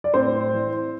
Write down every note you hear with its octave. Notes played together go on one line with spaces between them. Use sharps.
D5
A2 C4 C5
E3